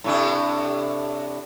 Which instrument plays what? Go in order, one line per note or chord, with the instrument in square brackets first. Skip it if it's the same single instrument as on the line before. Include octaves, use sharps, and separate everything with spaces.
[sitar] A2 C3 D4